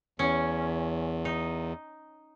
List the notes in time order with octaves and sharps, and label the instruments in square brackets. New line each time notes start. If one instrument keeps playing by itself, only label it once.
[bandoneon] E2 [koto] C#4
[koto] D#4